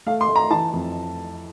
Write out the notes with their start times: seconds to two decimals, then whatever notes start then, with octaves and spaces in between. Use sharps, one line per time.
0.06 A3 F5
0.21 C6
0.29 A3
0.36 A#5
0.51 E3 A5
0.73 F2